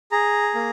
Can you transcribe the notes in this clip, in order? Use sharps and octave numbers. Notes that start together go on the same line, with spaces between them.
G#4 A#5
A#3